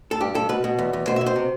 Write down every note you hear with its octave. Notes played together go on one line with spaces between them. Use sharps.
A4
G2 G4
G2 A4
B2 B4
B2
E2
E2
B2 C5
E5
B2
C5
C3